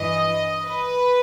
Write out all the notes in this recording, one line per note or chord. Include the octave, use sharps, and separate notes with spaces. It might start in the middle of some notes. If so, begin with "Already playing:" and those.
Already playing: G2 E3 D#5
B4